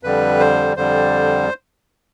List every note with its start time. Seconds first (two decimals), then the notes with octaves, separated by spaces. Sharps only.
0.03 F2 D3 G3 B4
0.39 C5
0.76 F2 D3 G3 C5